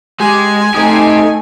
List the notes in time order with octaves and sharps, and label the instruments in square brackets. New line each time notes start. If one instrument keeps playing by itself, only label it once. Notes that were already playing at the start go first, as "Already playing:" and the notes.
[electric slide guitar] G#3 [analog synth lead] G4 [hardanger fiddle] G#5
[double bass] A3 [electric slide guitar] C4 G4 [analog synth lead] D#4